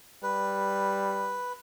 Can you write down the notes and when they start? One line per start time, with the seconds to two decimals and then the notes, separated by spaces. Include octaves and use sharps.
0.23 G3 B4